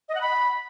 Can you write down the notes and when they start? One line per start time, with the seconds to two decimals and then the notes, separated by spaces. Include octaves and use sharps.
0.09 D#5
0.15 F#5
0.21 B5